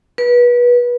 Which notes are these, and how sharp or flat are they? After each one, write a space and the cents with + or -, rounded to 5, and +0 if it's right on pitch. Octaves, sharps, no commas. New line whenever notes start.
B4 -25